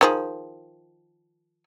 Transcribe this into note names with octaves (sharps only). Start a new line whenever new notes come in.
D#3 F3 G#4